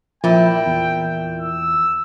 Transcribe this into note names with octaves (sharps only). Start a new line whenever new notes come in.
A#2 F3 E4 G5
E2
E6